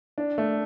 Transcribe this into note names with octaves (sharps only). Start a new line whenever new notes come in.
D4
A3